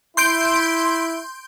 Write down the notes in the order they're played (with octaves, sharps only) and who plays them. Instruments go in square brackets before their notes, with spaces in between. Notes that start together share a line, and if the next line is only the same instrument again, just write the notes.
[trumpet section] E4 [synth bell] C6 G6 D7